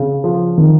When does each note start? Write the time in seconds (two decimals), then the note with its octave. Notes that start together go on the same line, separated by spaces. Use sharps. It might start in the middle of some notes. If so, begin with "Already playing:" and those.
Already playing: C#3
0.24 F3
0.58 D#3